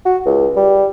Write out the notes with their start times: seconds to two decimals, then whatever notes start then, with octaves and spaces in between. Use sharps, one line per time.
0.05 F#4
0.25 C#2
0.56 G3